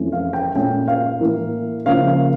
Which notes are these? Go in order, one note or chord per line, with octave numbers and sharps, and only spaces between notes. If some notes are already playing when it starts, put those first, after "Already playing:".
Already playing: F2 E3 A3 C#4
F5
G5
A#2 A3 C#4 G5
F5
A2 E3 A#3
C#3 F3 A#3 C#4 F5
F5